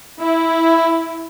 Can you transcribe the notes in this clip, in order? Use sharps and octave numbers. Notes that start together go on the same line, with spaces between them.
E4